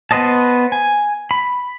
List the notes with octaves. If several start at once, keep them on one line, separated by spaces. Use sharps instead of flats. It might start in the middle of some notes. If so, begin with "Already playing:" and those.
B3 B4 C5 D#5 A5
G#5
B5